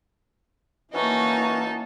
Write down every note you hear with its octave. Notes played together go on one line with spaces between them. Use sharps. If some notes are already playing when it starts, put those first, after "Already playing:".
E3 A#3 C#4 D#4 E4 F#4 A5